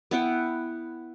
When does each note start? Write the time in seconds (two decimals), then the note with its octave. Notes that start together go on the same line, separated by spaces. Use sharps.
0.11 B3 E4 F#5 G5